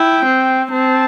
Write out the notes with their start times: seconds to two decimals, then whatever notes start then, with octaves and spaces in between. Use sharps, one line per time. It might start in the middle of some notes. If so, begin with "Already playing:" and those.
Already playing: E4 G5
0.26 C4
0.72 C4 A5